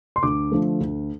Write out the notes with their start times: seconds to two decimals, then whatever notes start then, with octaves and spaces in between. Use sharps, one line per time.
0.16 C6
0.23 D2 D6
0.52 D3 F3 A3
0.80 D2